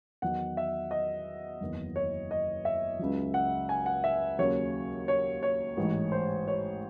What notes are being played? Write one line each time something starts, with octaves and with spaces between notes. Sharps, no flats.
E2 D#3 F#3 F#5
E5
D#5
F#1 E2 D#3
C#5
D#5
E5
C#2 C#3 F#3
F#5
G#5
F#5
E5
D#2 C#3 F#3 C#5
C#5
C#5
A1 G#2 E3
C5
C#5